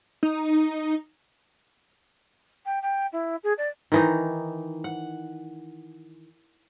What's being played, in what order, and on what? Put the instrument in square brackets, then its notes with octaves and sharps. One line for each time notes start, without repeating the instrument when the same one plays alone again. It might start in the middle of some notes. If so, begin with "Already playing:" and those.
[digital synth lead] D#4
[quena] G5
G5
E4
G#4
D5
[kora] D#3 E3 D#4
F#5